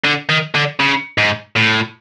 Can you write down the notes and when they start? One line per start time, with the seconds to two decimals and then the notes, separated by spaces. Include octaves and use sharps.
0.04 D3
0.29 D#3
0.55 D3
0.80 C#3
1.18 G#2
1.56 A2